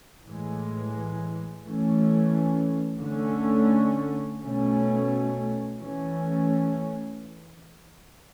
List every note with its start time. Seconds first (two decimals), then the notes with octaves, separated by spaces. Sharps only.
0.25 A2 E3 G#3
1.63 E3 A3 C#4
3.02 D3 A3 C#4
4.40 B2 A3 C#4
5.78 E3 A3 C#4